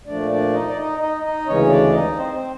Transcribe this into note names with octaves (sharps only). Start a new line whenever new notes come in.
A#2 F3 A3 D4 D5
D4 D5
D#4 D#5
D5
D#4 D#5
D#4 D#5
D#4 D#5
D2 C#3 E3 G#3 C#4 C#5
D4 D5
D#4 D#5
C4 C5
C4 C5